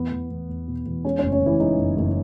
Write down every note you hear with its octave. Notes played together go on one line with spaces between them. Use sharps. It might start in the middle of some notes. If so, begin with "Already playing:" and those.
Already playing: E2 B3 B4
E2
E2
E2
B2
E2
G#3 C#4 C#5
F#1 C#4 C#5
C#4 C#5
F#1 E3 E4
G#3 D#4
F#1
F#1